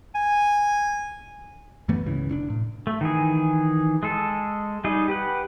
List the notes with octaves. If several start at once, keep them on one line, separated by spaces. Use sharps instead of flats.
G#5
F#2 E3 A3 B3
C#2 G#2 C#3 E3
F1 C#4 D4
A2
A3
D#3 E3 G#4
G#3 G#4 A4
G3 D#4 G#4 D#5
G4 B4 F#5